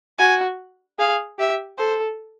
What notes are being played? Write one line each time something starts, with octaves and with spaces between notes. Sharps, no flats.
F#4 G#5
G#4 F5
G4 E5
A4 C5